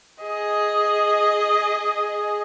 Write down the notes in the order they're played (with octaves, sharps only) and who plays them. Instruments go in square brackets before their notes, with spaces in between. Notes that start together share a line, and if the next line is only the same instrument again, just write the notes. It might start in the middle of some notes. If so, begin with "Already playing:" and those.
[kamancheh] G#4 D#5